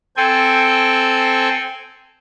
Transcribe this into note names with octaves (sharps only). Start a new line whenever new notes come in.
C4 A4 G5 G#5